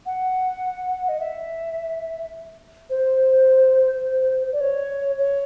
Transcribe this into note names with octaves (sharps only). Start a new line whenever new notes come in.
F#5
D#5
E5
C5
D5
C#5
C#5